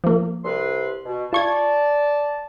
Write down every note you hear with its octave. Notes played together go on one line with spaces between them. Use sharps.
F3 A#3
C2 B4 C6
B2
F4 D5 A5 C#6 G#6